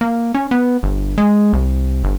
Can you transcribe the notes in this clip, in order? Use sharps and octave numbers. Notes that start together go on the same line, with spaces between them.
A#3
C#4
B3
G1
G#3
C2
G1